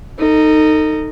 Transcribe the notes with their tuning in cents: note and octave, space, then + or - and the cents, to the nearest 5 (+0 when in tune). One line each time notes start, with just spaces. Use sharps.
D#4 -5 A4 +30